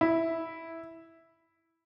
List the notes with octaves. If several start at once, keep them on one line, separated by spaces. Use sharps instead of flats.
E4